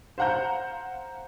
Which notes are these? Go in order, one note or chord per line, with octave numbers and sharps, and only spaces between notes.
C5 F5 F#5 A#5 G6